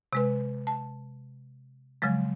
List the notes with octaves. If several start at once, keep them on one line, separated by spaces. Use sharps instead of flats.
C3 G#3 B4
A5
C#3 F3 F#3 G#3